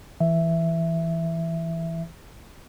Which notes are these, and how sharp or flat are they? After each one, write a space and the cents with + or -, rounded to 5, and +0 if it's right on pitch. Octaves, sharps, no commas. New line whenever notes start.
E3 +0 E5 +5